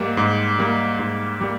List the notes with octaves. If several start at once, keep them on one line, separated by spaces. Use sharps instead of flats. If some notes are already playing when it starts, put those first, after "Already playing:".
Already playing: G#2 G3 A#3
G#2
G3 A#3
G#2
G3 A#3